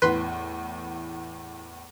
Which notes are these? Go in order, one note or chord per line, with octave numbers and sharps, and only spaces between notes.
E2 A2 B4 C6